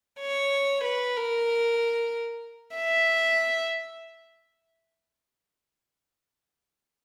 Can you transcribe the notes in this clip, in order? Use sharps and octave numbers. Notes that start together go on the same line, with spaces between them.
C#5
B4
A#4
E5